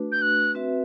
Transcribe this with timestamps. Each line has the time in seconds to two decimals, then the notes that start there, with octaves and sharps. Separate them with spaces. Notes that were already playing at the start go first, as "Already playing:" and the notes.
Already playing: A3 D4 F#4 B4
0.12 G6
0.22 F#6
0.55 C4 F#4 B4 E5